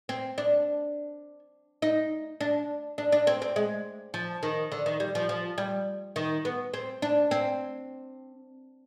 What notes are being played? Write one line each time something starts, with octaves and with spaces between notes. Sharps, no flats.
C4
D4
D#4
D4
D4
D4
C4
C4
G#3
F3
D#3
D3
D#3
G3
F3
F3
G3
D#3
B3
C4
D4
C4